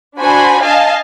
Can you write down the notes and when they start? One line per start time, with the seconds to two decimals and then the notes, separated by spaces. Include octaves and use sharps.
0.18 D4 F#4 C5 G#5 B5
0.62 D#5 F5 G#5 A5